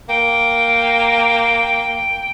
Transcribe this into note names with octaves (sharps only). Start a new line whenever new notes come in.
A#3 G5